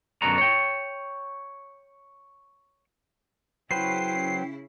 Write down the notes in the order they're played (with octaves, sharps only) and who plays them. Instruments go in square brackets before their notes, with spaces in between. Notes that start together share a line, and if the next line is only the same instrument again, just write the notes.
[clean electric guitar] F#2 B2 D3 F#4 A#5
C#5 G5
[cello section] C#3 C#4 E4 [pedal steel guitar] F#3 B4 C5 [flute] G5 [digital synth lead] C7